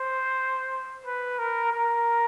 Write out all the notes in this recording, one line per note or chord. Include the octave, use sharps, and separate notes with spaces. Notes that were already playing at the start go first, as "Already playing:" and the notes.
Already playing: C5
B4
A#4
A#4